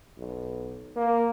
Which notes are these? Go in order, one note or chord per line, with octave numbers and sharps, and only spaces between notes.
B1
A#3